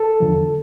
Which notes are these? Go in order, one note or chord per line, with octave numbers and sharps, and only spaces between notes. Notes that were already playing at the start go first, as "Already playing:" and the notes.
Already playing: A4
E2 D3 F3